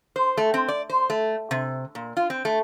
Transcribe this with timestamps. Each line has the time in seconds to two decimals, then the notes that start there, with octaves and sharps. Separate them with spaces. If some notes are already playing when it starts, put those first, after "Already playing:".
0.16 C5
0.37 A3
0.54 C4
0.69 D5
0.90 C5
1.10 A3
1.51 C3
1.95 A#2
2.17 F4
2.30 C4
2.45 A3